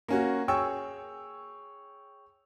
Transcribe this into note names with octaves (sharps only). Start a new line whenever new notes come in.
A#3 C#4 F#4
G#4 C#5 G5 C#6 E6